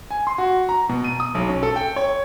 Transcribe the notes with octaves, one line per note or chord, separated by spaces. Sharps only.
G#5
C6
F#4
A#5
B2
D#7
D#6
B1
C#4
A4
G5
C#5